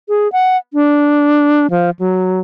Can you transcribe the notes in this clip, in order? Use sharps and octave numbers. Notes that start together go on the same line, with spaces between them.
G#4
F#5
D4
F3
F#3